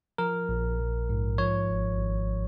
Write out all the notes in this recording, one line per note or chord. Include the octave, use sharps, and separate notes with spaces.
F3 A#4
A#1
A#1
G#2
F3 C#5
G#1
G#1